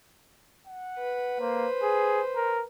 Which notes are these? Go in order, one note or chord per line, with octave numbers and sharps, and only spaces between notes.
F#5
B4
A#3 C5
G#4
A#4